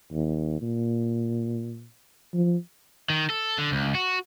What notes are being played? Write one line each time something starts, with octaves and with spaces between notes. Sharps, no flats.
D#2
A#2
F3
D#3
A4
D3
C#2
F#4